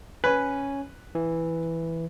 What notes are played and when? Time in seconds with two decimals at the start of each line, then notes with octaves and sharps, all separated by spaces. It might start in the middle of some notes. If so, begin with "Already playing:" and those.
0.24 C#4 B4 C#5 G#5
1.15 E3